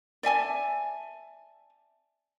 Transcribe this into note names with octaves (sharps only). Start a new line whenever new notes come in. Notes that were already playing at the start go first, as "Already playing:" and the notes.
D5 E5 G#5 A5